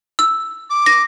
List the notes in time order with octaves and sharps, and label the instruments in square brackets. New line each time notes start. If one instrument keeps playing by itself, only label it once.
[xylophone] E6
[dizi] D6
[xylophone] A#6